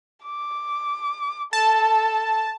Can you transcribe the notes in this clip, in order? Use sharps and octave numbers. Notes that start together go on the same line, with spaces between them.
D6
A4 A5